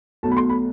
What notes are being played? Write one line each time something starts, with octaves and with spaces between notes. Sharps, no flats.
B1 B2 A3 A5
B5
C6
B5